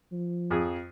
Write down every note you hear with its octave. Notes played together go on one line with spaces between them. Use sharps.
F3
F2 G#4